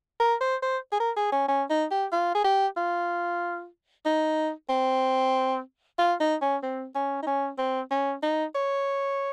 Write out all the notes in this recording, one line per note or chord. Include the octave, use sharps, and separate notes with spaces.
A#4
C5
C5
G#4
A#4
G#4
C#4
C#4
D#4
G4
F4
G#4
G4
F4
D#4
C4
F4
D#4
C#4
C4
C#4
D#4
C#4
C4
C#4
D#4
C#5